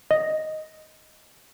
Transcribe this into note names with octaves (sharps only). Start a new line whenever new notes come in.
D#5